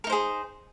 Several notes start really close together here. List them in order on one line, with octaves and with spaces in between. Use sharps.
A#4 D#4 C5 G#4